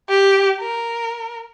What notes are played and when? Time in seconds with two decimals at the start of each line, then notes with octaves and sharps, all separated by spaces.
0.09 G4
0.61 A#4